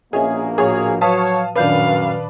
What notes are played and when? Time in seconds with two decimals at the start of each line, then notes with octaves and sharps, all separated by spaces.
0.13 A#1 B2 A#3 C#4 G#4 D#5 E5 G#5
0.58 A2 F3 F#4 G#4 C#5
1.01 F#3 B4 C#5 F5 A5 D#6
1.56 F#2 A#2 D#3 D4 B4 F5